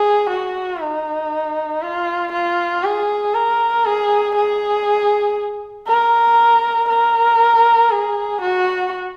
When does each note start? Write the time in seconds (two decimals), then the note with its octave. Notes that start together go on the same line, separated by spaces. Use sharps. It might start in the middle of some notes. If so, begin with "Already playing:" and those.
Already playing: G#4
0.30 F#4
0.81 D#4
1.82 F4
2.32 F4
2.84 G#4
3.34 A#4
3.85 G#4
4.36 G#4
5.87 A#4
6.89 A#4
7.91 G#4
8.42 F#4